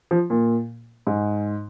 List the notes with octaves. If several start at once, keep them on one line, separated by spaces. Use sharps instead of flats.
F3
A#2
G#2